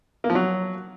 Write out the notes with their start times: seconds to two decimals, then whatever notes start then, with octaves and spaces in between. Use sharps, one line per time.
0.24 A#3
0.30 F3
0.35 F#3